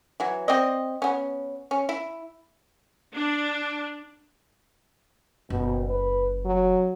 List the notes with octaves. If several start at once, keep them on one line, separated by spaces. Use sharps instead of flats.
E3 F#3
C4 D5 D#5
B3 C#4
C#4
E4
D4
F#1 B2
B4
F#3